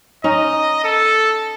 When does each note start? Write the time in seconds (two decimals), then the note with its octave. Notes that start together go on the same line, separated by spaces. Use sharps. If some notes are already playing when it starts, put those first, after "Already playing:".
0.24 C#4 D#4 D#5
0.84 A4